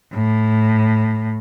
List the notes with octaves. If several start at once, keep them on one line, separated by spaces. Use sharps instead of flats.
A2